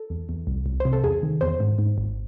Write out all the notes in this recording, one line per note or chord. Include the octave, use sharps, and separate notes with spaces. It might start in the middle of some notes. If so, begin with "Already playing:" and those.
Already playing: A4
E2
E2
C2
C2
C3 C5
A4
E2 G#4
D#3
E2 C5
G#2
G#2
G#1